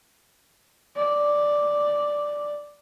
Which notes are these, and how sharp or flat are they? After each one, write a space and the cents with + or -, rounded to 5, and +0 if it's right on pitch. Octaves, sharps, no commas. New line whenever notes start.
D5 +0